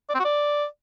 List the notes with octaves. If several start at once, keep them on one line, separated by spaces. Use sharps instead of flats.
D5
C4
F#4
D5